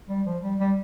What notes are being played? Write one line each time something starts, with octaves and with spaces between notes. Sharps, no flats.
G3
F3
G3
G3